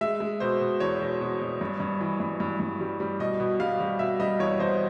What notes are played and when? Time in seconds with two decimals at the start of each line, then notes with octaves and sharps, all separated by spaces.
0.01 G#3 E5
0.20 G#3
0.40 B2 C5
0.61 B2
0.80 E2 C#5
1.01 B2
1.21 B2
1.41 B2
1.61 G2
1.80 G2
2.01 E3
2.20 G2
2.40 G2
2.60 G2
2.81 G3
3.00 G3
3.19 B2 D#5
3.40 B2
3.60 G3 F5
3.80 G3
3.99 B2 E5
4.20 G3 D#5
4.39 E2 C#5
4.59 E2 C5